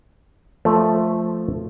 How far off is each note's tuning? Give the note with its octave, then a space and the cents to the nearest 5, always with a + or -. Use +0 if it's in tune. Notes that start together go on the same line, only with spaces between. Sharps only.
F3 +0 A3 +0